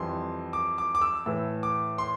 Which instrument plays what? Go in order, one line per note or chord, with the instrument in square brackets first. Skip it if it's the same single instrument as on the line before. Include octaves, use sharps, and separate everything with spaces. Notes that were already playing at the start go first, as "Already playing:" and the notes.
Already playing: [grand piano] F2 E3 G3 C6
D6
D6
D6
E6
A2 E3 A3 E6
D6
C6